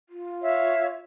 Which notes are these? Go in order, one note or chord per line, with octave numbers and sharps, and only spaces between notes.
F4
C#5 E5 F5